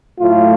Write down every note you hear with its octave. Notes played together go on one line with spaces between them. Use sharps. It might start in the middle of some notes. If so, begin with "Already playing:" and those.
A2 F#3 A3 F4